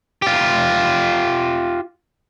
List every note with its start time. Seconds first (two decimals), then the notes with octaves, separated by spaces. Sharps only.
0.22 F4 G4